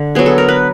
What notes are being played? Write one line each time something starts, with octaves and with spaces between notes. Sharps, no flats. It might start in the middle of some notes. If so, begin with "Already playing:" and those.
Already playing: D3
F#3 B3 G#4
A4
A#4
B4